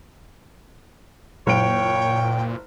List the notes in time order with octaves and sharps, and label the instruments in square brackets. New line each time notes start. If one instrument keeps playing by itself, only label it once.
[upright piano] F#1 D7 [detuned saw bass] A#2 [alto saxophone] C#5 [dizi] G5